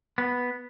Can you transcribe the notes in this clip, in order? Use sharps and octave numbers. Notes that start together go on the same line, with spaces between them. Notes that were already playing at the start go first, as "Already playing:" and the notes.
B3